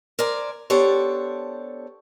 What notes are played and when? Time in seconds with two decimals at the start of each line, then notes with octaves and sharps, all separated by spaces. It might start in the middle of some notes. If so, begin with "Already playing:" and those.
0.19 A#4 C5 D5 G#5
0.70 B3 D4 G4 A4 C5 C#5